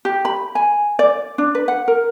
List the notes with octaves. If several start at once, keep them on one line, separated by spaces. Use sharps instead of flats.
G4
B5
G#5
D5
D4
B4
F#5
A#4